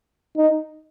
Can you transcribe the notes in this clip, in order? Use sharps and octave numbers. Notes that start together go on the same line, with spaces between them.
D#4